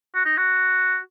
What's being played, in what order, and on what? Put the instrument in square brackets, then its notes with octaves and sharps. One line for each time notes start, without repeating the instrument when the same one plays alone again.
[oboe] F#4
D#4
F#4